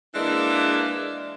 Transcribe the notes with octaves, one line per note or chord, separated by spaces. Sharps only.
E3 G#3 A#3 D4